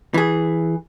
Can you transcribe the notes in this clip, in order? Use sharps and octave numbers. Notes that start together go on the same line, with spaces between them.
E3 G#4